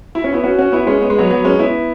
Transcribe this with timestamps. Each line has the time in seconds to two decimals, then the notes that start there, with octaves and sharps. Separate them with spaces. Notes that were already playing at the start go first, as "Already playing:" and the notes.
0.15 E4
0.24 C#4
0.33 B3 E4
0.44 C#4 F#4
0.58 C#4 F#4
0.72 B3 E4
0.87 G#3 C#4
1.01 B3
1.10 G#3
1.18 F#3 B3
1.30 F#3 B3
1.44 G#3 C#4
1.59 B3 E4